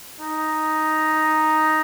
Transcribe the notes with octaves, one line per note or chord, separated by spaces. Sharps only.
D#4